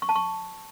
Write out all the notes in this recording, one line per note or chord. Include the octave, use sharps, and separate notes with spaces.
C#6
A5
C#6